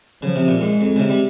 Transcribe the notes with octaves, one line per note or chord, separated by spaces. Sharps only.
C#3 F3
C3
A#2
G#2 G#3
F2
C#3
C3
G3